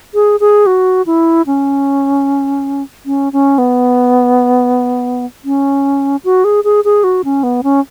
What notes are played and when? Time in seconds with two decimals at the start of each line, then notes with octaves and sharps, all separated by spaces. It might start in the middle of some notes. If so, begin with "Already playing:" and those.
0.14 G#4
0.40 G#4
0.66 F#4
1.06 E4
1.47 C#4
3.06 C#4
3.33 C#4
3.58 B3
5.45 C#4
6.24 F#4
6.44 G#4
6.64 G#4
6.85 G#4
7.04 F#4
7.24 C#4
7.43 B3
7.63 C#4